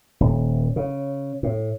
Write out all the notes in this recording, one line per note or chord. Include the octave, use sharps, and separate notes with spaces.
D#1
C#3
A2